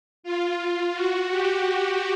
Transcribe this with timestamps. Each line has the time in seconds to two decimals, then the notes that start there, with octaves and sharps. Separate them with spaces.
0.23 F4
0.94 F#4
1.30 G4